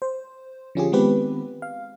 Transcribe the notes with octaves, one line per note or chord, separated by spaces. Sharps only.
C5
D3 F3 C#4 F4 G4 G#4
D#3 G#3 B3 C4 G4 B4
F5